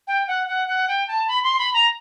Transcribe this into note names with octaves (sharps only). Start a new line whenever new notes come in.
G5
F#5
F#5
F#5
G5
A5
B5
C6
B5
A#5